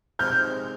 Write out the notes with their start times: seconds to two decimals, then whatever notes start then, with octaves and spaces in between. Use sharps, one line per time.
0.19 C3 D#3 G#3 C4 F6 G6